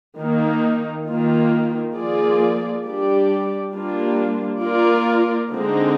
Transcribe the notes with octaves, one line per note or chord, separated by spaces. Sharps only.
D#3 A#3 D#4
D#3 A#3 F4
F3 A#3 F4 G#4 D5
G3 D4 G4 D5
G3 A#3 D4 F4
A#3 F4 A#4 D5
D3 G#3 C4 D#4